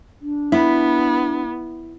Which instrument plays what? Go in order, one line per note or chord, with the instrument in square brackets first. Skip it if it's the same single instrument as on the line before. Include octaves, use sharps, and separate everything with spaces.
[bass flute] D4
[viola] B3 [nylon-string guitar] E4